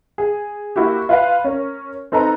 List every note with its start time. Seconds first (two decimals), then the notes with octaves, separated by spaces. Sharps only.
0.18 G#4
0.76 A#3 E4 F#4 G4
1.09 F4 B4 F5
1.44 C#4 A#4
2.12 C4 D#4 A4 B4 A#5